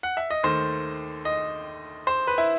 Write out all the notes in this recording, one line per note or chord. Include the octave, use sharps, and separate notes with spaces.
F#5
E5
D#5
D#2 D#3 A3 D#4 C5
D#5
C5
B4
E4